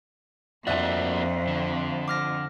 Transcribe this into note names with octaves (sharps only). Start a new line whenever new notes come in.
F2 A#3 D4 F#4 D5 E5 F#6
D3
D6 F6 A#6